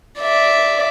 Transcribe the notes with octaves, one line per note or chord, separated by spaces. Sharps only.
D5 E5